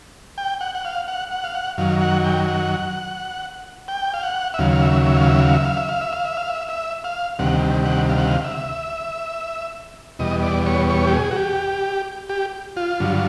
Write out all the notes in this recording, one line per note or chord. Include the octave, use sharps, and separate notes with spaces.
G5
F#5
F#5
F5
F#5
F#5
F5
F#5
F#2 D#3 F#3 F5
F#5
G5
F#5
G5
F5
F#5
E5
D#2 C#3 F#3 F5
F5
E5
E5
F5
E5
F5
E5
F5
E5
F5
E5
F5
E5
F5
E5
E5
F5
D2 C3 D#3 G3 F#5
F#5
F5
F#5
F5
E5
E2 B2 G3 D#5
D5
C#5
C#5
G4
G#4
F#4
G4
G4
F4
G2 D3 F#3